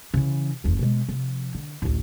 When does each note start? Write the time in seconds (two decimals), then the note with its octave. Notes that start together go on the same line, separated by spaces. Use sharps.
0.14 C#3 E3
0.64 F#1 E2
0.79 B2 G#3
1.09 C3 F3
1.55 D3
1.82 A1 D2